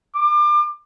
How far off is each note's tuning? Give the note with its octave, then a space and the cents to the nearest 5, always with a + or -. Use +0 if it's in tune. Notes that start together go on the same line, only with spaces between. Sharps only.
D6 +30